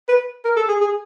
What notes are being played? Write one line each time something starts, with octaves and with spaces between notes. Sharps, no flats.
B4
A#4
A4
G#4
G#4